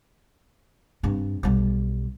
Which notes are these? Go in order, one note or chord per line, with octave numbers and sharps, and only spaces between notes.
G2 C4
B1 G3